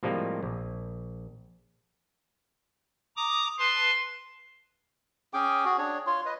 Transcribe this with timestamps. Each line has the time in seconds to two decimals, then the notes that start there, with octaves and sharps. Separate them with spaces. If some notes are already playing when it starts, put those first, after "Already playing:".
0.03 A2 C3 F3 G3 G#3 A#3
0.43 A#1
3.17 A#5 D6 D#6
3.59 B4 A5 C6
5.34 C#4 G#4 G5 D6
5.65 F#4 G#4
5.78 D4 C#5
6.07 F4 C#5 C6
6.26 B4 D#5